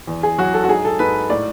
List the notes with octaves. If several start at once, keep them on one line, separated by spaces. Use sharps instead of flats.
E2
G#4
F#3 F#4
A4
F#4
G#2 G#4
A4
G#2 B4
A2 D5